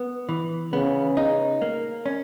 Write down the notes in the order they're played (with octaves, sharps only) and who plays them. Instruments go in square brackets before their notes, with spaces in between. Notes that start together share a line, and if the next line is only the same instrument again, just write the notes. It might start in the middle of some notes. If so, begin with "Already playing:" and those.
Already playing: [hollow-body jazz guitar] B3
E3
[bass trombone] C#3 [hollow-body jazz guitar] B3
[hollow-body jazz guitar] D#4
A#3
C#4